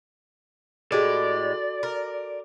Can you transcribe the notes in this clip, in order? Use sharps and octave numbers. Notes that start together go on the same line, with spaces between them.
A2 G#3 F#4 G4 A4 D5 D6
A#4